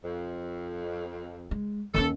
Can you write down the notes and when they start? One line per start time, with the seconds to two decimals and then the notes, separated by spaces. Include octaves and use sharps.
0.04 F2
1.51 G#3
1.94 D#2 C#4 A4